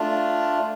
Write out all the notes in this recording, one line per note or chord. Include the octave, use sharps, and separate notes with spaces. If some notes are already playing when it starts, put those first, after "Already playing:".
Already playing: A3 D4 F4